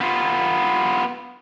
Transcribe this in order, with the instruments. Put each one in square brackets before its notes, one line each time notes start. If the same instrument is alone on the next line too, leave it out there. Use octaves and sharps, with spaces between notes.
[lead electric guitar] B3 F4